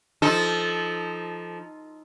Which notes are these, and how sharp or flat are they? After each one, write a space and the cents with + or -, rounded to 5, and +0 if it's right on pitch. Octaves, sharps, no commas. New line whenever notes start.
F3 -10 D#4 +0 A4 -15